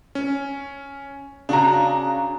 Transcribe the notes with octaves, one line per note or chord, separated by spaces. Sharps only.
C#4
C#3 D4 F#4 A#5